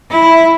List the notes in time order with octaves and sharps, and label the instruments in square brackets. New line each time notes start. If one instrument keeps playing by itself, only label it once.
[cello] E4